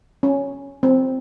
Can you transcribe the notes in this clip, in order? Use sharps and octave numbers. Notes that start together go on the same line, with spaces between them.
C#4
C4